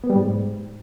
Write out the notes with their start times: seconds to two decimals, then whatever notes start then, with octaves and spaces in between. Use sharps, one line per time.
0.04 B3
0.10 G3
0.16 G#2